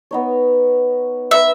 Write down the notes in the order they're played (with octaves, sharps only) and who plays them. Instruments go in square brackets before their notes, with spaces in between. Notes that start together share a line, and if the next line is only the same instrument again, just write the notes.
[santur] B3 D#4 C#5
[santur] A#4 B4 [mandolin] E5